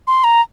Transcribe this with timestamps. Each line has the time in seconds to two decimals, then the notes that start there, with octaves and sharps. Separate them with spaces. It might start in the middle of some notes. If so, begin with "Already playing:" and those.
0.07 C6
0.24 A#5